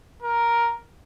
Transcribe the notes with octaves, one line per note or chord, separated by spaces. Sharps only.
A#4